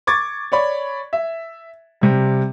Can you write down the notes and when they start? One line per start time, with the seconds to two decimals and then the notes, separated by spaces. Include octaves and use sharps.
0.07 C#6 D6 G#6 A6
0.52 C#5 D5 B5 C#6
1.13 E5
2.01 C3 G3